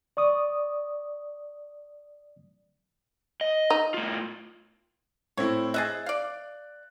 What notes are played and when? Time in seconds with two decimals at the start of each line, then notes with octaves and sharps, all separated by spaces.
0.17 D5 C#6 D#6
3.41 D#5
3.70 D#4
3.94 A2 F4
5.37 A2 C4 E4 C#5
5.74 G#4 D#5 E5 F#6 A6
6.06 D5 F5